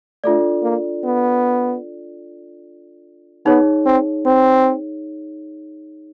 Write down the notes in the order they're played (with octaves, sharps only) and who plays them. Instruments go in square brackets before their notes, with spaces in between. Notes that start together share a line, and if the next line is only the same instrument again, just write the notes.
[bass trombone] A3 [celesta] D4 F4 A4 D5
[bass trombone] A#3
B3
[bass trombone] B3 [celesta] D#4 G#4 C#5
[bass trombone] C4
C4